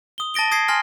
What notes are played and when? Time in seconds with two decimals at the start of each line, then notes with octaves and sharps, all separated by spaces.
0.18 D#6 G7
0.34 A5 A6 A#6 D7 G7
0.51 D#6 G#6 A#6 C7
0.68 G#5 C6 F6 A#6